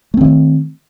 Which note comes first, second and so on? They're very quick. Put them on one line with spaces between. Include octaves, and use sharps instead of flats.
A3 C4 D#3